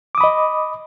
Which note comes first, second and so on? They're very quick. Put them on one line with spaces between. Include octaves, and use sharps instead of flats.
D6 D#6 B5 D#5